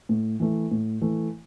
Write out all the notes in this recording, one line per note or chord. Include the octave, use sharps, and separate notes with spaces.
A2
E3 A3
A2
E3 A3